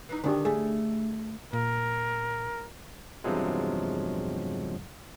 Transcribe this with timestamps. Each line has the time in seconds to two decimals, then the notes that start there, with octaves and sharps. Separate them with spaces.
0.09 E3 D#4
0.24 D3 D#3 D4 G4
0.45 A3 G#4
1.53 A#2 A#4
3.24 E2 G2 C3 F3 F#3 G#3